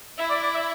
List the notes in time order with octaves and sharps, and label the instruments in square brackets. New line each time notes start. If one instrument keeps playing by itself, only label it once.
[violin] E4 [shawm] E5
[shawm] D5
D5
E5